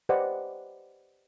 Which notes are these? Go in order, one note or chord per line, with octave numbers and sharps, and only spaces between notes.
G4 B4 C5 D5 D#5 F#5